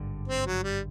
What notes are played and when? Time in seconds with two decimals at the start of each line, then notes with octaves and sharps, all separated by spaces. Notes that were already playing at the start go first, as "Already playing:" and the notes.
Already playing: G#1 G2 D3
0.28 C4
0.46 F#3
0.64 G3